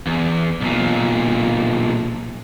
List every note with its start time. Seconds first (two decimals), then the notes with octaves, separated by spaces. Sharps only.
0.07 E2
0.61 B1 A#2